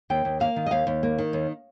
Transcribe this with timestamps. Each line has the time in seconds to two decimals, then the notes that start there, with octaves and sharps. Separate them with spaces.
0.10 D#2 G5
0.25 D#2
0.40 A#3 F5
0.56 D#3
0.66 D#5
0.71 D#2 F5
0.87 D#2
1.03 A#3
1.18 D#3
1.33 D#2